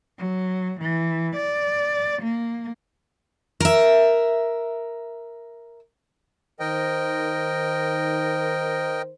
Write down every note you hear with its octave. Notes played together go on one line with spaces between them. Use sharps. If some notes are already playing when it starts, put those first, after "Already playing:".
F#3
E3
D5
A#3
A#4 E5
D#3 A#4 C5 D#5 G5